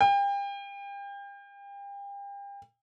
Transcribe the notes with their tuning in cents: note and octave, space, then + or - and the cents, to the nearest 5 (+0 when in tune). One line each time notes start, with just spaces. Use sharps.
G5 +35